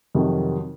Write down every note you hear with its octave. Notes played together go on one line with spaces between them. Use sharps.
F2 C3 D#3 F#3